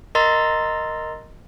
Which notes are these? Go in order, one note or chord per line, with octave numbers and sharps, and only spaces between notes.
A#4 D#5 A#5 C6 E6 A6